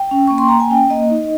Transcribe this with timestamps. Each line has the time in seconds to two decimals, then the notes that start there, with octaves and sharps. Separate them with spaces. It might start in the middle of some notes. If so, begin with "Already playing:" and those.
Already playing: G5
0.11 C#4
0.28 A#3 C#6
0.38 C6
0.49 A#3 A#5
0.60 G#5
0.70 C#4 G5
0.90 A#3 D#5
1.10 D#4